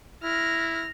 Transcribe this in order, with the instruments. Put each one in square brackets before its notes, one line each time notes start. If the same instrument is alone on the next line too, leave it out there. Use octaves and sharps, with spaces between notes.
[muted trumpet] E4 [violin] F6 A#6